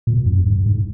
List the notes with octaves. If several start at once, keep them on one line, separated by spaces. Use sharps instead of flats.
A#2
F#2
G2
G#2